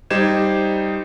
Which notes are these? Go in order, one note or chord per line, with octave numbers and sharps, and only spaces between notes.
G3 D#4 G4 C5 G#6 E7